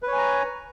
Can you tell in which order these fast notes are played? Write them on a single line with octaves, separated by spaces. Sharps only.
B4 C#5 G#5 A#5